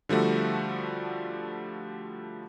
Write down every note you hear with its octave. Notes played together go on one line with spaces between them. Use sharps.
D3 F3 G3 A3 F#4